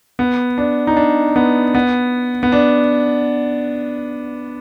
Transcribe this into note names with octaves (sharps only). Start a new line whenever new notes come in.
B3
D4
D#4
D4
B3
B3
B3
D4